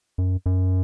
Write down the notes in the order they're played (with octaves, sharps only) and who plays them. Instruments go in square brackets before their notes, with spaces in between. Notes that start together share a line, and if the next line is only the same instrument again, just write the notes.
[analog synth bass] F#2
F#2